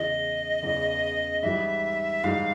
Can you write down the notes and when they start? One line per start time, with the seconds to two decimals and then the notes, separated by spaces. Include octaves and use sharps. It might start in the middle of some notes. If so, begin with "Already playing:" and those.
Already playing: E2 C#3 E3 D#5
0.62 E2 C#3 E3
1.43 G#2 E3 G3 E5
2.24 G#2 E3 G3 F5